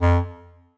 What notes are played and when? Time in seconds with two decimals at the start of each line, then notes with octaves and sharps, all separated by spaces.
0.01 F2